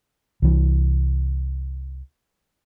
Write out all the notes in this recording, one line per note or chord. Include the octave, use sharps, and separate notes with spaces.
C2 E3